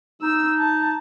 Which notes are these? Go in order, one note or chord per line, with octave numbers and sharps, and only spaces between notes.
D#4 E6
A5